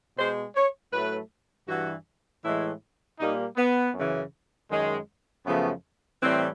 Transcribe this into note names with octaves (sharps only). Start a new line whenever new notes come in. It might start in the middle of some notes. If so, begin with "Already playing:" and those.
B2 G#3 C5
C#5
A2 F#3 A3 B4
G2 E3 G3 F#4
A2 E3 G#3 E4
A#2 G3 A#3 D#4
B3
F#2 C#3 E3
F#2 D#3 G#3
F#2 C#3 F3 A3 B3
A2 E3 G3 C4